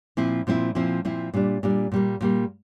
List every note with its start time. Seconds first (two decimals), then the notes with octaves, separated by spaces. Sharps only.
0.17 A#2 F3 C4 E4
0.47 A#2 F3 C4 E4
0.75 A#2 F3 C4 E4
1.05 A#2 F3 C4 E4
1.34 A#2 G3 D4
1.63 A#2 G3 D4
1.92 A#2 G3 A#3
2.21 A#2 G3 A#3